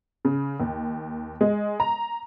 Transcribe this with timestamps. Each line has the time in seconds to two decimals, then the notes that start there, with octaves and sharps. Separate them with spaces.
0.25 C#3
0.60 D#2
1.41 G#3
1.80 A#5